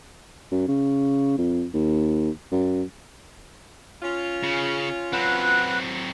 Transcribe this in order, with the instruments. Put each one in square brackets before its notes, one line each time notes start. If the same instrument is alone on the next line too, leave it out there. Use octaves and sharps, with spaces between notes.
[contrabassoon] F#2
C#3
F2
D#2
F#2
[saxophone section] C#4 F4
[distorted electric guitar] C#3
[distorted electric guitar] F#3 C4 [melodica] B4 F#5